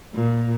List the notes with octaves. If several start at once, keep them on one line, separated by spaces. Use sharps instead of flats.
A#2